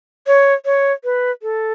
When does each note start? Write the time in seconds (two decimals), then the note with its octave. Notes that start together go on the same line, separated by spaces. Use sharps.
0.27 C#5
0.65 C#5
1.04 B4
1.42 A4